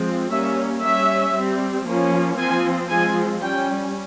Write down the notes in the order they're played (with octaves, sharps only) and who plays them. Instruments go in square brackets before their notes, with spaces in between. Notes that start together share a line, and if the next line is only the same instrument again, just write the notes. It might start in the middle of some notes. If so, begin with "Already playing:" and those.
Already playing: [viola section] F3 G#3 C4
G3 A#3 C#4 E5
G3 C#4 E5
G3 C4
F3 A#3 C#4
F3 C4 G#5
F3 G#3 C4 G#5
G3 C#4 G5